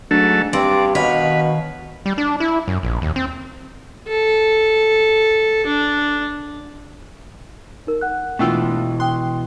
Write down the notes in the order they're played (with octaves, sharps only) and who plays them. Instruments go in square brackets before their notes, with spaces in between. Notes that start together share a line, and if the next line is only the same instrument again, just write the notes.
[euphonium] G#2 [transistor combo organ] F#3 A3 A4 [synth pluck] D4
[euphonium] G2 [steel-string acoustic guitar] C4 [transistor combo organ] D5
[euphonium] B2 [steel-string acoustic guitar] D#3 C#5 F5 [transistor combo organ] B4
[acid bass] G3
D4
E4
F#2
A#1
D#2
C4
[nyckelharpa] A4
D4
[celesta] D#4 A#4
F#5 F#6
[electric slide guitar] B2 E3 [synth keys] A3 D4 F4 [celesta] G5 E6
[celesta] G5 D#6 F#6 [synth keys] C6